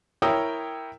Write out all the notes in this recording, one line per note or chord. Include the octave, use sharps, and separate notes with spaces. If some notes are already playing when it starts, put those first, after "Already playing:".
E4 A#4 C#5 G5 D#6 E6